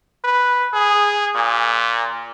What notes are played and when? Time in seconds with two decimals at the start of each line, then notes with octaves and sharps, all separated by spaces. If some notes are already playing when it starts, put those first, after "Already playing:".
0.24 B4
0.73 G#4
1.35 A#2